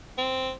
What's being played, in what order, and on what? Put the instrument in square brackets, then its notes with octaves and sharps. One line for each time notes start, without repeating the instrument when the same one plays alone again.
[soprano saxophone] C4